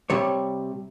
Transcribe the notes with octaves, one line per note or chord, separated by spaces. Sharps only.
C3 G3 C#5